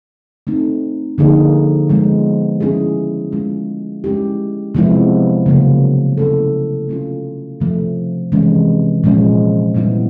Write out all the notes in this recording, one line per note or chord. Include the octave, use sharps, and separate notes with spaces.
A3 C4 D#4
D3 F3 A#3 D#4 G#4
F3 G#3 B3
F3 A3 C#4 E4 G#4
G#3 C#4 F4
G#3 C#4 E4 G4
C3 F3 G#3 B3 E4
C#3 F#3 A#3
A3 C#4 E4 A4
A3 C#4 F4
C3 F3 A3
C3 E3 G#3 C#4
A#2 F3 G#3 C#4
A#2 G3 B3 E4